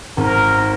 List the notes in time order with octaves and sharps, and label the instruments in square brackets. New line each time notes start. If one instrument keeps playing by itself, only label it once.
[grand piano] G#1 [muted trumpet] A#4